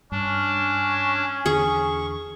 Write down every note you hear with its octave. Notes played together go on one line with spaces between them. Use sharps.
G2 C#4 D4
E2 D3 G#4 C#6